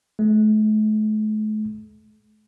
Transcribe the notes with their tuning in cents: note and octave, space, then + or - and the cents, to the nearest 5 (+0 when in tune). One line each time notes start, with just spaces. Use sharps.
A3 -45